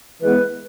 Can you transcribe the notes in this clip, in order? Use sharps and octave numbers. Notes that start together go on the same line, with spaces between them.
E3 G#3 B3 B4